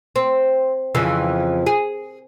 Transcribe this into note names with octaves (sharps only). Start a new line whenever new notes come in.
C4
F2 C#3 E3
G#4